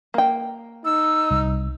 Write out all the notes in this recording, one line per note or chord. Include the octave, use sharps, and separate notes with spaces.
A#3 G5
D#4 E6
C2